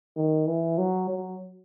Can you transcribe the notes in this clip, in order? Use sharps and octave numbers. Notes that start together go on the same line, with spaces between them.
D#3
E3
F#3
F#3